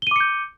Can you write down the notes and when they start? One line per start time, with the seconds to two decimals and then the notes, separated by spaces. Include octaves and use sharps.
0.02 G7
0.07 D#7
0.11 D6
0.16 C#7
0.20 G6